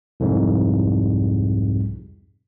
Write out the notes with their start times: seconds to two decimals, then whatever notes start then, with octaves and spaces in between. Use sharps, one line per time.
0.20 C2 F2 G#2